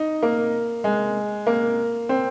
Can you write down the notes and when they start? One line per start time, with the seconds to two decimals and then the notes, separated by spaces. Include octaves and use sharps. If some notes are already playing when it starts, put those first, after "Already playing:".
Already playing: D#4
0.23 A#3
0.84 G#3
1.47 A#3
2.09 C4